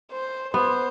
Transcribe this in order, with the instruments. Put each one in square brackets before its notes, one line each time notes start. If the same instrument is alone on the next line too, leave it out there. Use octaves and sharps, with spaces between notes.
[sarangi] C5
[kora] B3 [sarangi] C5